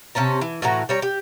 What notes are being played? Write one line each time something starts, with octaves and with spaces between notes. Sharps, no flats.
C3 C#4 A5 A#5
E3
A2 E3 F#4 A#5
G3 C#5 A#5
G4